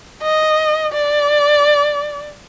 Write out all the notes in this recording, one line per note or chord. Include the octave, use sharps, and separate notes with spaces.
D#5
D5